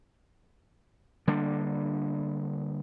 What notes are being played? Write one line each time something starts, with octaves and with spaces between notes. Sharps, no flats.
D3 G3 A#3 D4